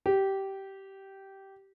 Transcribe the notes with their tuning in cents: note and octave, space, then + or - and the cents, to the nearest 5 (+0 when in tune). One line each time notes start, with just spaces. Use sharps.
G4 -15